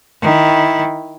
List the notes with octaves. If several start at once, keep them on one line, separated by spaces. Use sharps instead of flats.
D#3 E4